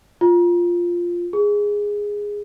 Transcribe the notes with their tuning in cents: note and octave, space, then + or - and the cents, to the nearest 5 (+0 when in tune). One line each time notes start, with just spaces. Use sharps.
F4 +0
G#4 -10